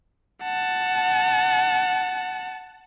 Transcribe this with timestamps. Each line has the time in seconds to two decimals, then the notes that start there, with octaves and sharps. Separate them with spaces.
0.43 F#5 A5